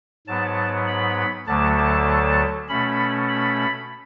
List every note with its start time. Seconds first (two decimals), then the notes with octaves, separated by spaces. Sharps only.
0.27 G#2 F#3 B3 A5
0.87 B5
1.47 D2 D3 F#3 A3 A5
1.78 A5
2.68 B2 A3 C#4 B5
3.29 B5